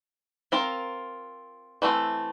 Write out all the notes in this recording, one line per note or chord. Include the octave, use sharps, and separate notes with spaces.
C4 F4 A#4
E3 A3 C4